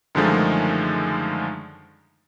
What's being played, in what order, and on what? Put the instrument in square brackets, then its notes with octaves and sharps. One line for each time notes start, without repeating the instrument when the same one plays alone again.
[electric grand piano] F#2 D3 D#3 F3 G#3 A3